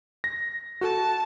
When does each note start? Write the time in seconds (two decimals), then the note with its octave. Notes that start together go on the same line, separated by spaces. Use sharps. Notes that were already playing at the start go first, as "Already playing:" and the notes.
0.24 A#6
0.81 F#4 A4 A5